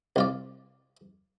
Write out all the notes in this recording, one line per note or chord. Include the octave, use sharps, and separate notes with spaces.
C2 F4 D5